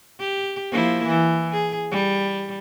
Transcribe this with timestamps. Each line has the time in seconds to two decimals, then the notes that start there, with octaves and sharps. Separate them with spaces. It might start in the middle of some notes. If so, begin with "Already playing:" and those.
0.20 G4
0.72 F3 A#3 E4
1.07 E3
1.52 G#4
1.91 G3